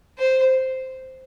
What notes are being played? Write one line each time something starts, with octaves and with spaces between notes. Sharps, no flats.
C5